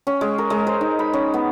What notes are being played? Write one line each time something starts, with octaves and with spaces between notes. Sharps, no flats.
C#4
G#3
A#4
G#3
C5
D#4
B5
C#4
B3